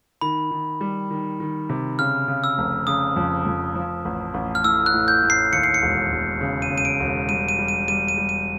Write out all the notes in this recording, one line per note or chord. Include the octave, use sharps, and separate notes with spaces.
D#3 B5
D#3
G3
D#3
D#3
C3
C#3 F6
C#3
E6
F1
C#3 D#6
F2
F2
F3
A1
A1
F6
A2 E6
F#6
A2
G6
A2
C7
D#2 C#7
C7
C#7
E1
E1
C#3
D#7
C#3
D#7
D7
E1
G3 D#7
D#7
G3
D#7
G3 D#7
D#7
G3
D#7